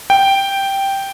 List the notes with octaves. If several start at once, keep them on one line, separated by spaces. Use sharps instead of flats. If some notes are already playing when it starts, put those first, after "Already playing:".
G5